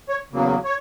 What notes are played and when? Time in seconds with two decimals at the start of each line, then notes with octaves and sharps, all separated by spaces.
0.09 C#5
0.32 E2 C#3 F#3 A#3
0.65 C#5